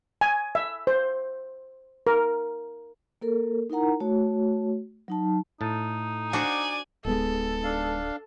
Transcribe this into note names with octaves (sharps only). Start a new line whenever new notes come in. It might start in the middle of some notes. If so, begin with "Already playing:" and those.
G#5
E5
C5
A#4
A#3 A4 A#4
D#4 E4 A#4 F#5 A#5
A3 F#4 C#5
F#3 D#4 A5
A2 D#4 A5
D4 F#4 C5 D5 G#5
D1 G#3 B3 D#4 A4
D4 F5